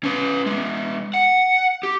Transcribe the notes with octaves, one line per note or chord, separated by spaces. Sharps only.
C#4 B4
G#3 B3
F#5
G4